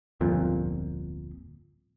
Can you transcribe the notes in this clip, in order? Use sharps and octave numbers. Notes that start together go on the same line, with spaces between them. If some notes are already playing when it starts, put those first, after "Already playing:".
D1 G1 F2 A#2